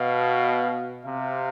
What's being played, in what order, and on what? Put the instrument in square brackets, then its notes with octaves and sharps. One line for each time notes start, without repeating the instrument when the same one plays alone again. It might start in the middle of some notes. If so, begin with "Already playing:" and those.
Already playing: [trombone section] B2 [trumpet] F5
[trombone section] C3 [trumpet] F5